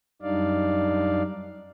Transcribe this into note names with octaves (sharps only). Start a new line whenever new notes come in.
F#2 G3 D4 D#4 D5 F5